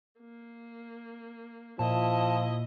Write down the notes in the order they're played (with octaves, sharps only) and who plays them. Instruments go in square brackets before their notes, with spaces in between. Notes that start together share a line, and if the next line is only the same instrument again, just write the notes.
[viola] A#3
[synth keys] A#2 [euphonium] F3 [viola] E4 D#5 [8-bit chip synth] A5